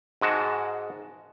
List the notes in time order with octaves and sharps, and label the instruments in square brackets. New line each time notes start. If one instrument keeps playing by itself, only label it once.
[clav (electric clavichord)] G#2 G#3 F#4 A5